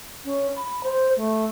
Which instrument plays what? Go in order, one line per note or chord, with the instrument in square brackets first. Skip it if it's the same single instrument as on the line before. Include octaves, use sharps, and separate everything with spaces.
[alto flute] C#4
B5
C5
A3